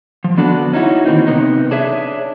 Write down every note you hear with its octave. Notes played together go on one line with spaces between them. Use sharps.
F3
D3 B3 D4 F#4 A4
C#4 D#4 E4 F#4
D#3 E3 A#3 C4 D#4
C3 B3 D#4
D4 G#4 C#5 E5